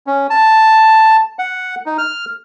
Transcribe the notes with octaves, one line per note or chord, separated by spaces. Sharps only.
C#4
A5
F#5
D#4
F6